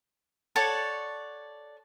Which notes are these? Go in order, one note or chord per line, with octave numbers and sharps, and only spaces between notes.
A4 C#5 D5 F#5